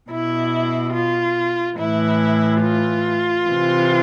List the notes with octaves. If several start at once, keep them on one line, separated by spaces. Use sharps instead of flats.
B2 E4
F4
A2 E3 E4
F4
E3
C3